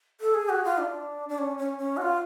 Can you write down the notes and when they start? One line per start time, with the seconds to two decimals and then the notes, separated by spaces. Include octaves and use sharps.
0.21 A4
0.34 G#4
0.49 F#4
0.64 F4
0.79 D4
1.29 D4
1.38 C#4
1.58 C#4
1.78 C#4
1.97 F#4
2.01 F4